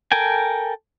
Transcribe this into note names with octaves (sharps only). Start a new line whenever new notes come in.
A4 A#4 G5 G#5